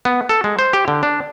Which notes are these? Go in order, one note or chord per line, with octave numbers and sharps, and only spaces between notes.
B3
A4
G#3
C5
G4
D3
D4